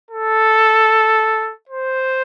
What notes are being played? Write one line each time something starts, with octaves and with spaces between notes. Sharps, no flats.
A4
C5